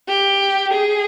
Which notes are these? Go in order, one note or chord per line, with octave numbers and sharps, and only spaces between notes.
G4
G#4